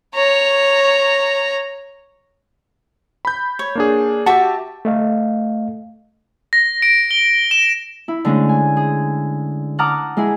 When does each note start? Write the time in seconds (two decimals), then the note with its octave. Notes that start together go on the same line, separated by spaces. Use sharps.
0.15 C#5 A#5
3.25 B5 G6
3.59 C#5
3.75 A#3 D4 G#4
4.26 F#4 G4 E5 A5
4.85 A3 D#5 F5
6.53 A#6
6.82 D7
7.11 G7
7.51 E7
8.08 E4
8.25 D3 G#3 A3 C#4
8.49 G#5
8.77 G#4
9.79 F#5 A5 A#5 D6 D#6 F6
10.17 G#3 E4 G#4